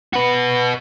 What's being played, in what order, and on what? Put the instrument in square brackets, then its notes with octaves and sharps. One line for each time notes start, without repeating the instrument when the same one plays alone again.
[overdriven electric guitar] F#4 B4